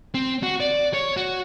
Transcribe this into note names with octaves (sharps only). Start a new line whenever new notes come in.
C4
F#4
D5
C#5
F#4